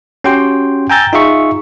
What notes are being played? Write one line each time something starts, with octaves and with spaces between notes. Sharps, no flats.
C#4 F#4 G4 G5 C6
G5 G#5 A#5 E6 G6 A6
D#4 F4 G#4 E5 C#6